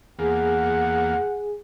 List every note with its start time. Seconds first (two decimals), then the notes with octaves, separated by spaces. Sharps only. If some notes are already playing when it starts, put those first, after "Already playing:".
0.19 E2 A#3 G#4 F#5 G#5